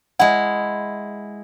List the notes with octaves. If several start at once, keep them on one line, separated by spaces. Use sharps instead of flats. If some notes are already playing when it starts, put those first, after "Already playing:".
G#3 E4 F#5